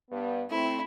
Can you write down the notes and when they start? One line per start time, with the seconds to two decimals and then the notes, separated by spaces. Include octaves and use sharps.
0.10 G2 B3
0.50 A3 C4 E4